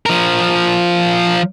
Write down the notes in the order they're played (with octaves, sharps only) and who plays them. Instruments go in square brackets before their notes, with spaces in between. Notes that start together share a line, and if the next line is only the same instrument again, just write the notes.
[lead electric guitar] F3 A#4